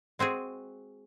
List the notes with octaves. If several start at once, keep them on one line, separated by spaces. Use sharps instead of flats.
G#3 C4 F#4 G#4